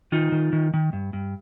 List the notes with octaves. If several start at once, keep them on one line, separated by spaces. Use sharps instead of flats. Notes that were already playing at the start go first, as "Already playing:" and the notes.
D#3 D#4 F4
D#3
D#3
D#3
G2
G2